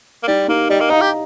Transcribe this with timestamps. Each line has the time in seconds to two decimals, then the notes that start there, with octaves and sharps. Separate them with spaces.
0.23 A#3
0.28 G3 D#4
0.48 A#3 D#4 G4
0.70 G3 D#5 G5
0.80 A#3
0.90 D#4 F5 A#5
1.01 G4